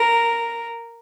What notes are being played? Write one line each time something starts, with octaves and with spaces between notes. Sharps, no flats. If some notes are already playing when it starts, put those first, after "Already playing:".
Already playing: A#4